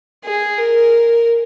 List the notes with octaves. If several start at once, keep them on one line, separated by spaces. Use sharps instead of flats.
G#4
A#4